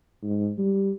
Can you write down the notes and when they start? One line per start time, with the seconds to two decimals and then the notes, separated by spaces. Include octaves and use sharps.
0.23 G#2
0.58 G3